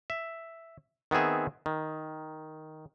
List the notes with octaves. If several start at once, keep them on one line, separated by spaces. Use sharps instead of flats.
E5
D#3 B3 C4 G#4 E5
D#3